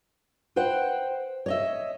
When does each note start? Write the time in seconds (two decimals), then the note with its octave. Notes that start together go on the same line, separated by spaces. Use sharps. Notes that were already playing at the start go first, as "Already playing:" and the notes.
0.56 B4 C5 F#5 G5
1.46 C#5 D#5 E5